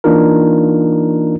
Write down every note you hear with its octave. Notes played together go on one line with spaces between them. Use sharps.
E3 A#3 D4 D#4 F4 A#4